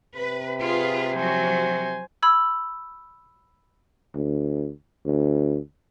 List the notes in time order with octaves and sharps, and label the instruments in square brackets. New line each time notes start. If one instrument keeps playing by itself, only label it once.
[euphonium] C3 [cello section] B4
[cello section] F4 G#4 B4
[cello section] F3 F#3 F#4 [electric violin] C5 G#5
[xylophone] B5 E6 G#6
[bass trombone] D2
D2